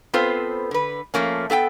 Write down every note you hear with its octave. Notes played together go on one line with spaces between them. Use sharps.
B3 C4 F4 A4 B4 C5
D3 B4
F3 A3 A#3 C#4
B3 A4 F5 G5